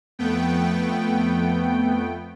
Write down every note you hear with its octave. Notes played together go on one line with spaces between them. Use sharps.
F2 A3 B3 G5